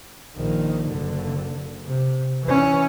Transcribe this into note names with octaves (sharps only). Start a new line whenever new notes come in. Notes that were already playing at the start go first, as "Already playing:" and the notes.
A#1 D#3
F#1 D3
C3
E3 C#4